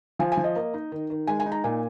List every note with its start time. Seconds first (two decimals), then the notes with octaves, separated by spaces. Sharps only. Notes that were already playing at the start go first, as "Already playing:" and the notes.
0.19 F3 G#5
0.32 G#5
0.37 F3
0.44 D#5
0.56 A#3
0.74 D#4
0.92 D#3
1.10 D#3
1.27 G#3 G#5
1.40 G#5
1.46 D#4
1.52 A#5
1.64 A#2 G#5